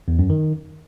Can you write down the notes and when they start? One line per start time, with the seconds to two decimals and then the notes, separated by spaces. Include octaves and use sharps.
0.08 E2
0.19 F#2
0.30 D#3